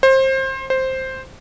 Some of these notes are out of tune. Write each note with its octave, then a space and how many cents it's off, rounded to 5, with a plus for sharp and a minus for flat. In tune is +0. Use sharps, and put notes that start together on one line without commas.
C5 +25
C5 +5